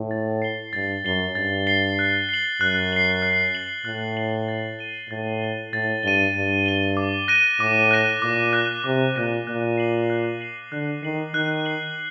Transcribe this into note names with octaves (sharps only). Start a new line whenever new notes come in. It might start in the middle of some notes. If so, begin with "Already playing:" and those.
Already playing: A2
A6
C7 G7
G2 A6
F#2 C7 G7
G2 A6
C7 G7
F#6
C7 F#7
F#2 F#6
C7 F#7
F#6
C7 F#7
A2 F#6
C7 F#7
A6
D#7 G7
A2 A6
D#7 G7
A2 A6
G2 D#7 G7
G2 A6
D#7 G7
D6
F#6 A#6 D#7
A2 D6
F#6 A#6 D#7
A#2 D6
F#6 A#6 D#7
C3 D6
A#2 F#6 A#6 D#7
A#2 F#6
C7 F#7
F#6
C7 F#7
D3 F#6
D#3 C7 F#7
D#3 F#6
C7 F#7